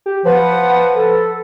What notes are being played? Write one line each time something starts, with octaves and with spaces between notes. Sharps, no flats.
G4
F3 B4 F#5
A4